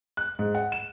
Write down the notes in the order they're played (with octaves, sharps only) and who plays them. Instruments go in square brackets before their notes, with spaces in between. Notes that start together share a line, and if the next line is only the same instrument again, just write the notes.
[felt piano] F#6
G#2
F#5
E7